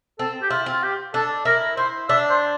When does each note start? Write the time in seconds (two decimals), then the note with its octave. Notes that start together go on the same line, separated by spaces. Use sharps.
0.19 C4 A4
0.42 G4
0.50 E4 F4
0.66 C4 F4
0.83 G4
1.14 D4 A4
1.45 E4 A#4
1.77 E4 C5
2.09 D4 E5
2.30 C5